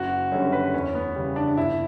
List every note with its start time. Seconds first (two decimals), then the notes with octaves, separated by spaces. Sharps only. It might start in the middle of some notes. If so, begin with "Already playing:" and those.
Already playing: F#1 F#4
0.32 F#2 D3 G3 C#4
0.52 B4
0.74 E2 C#4
0.95 B3
1.16 C#3 G3
1.36 D4
1.57 G1 E4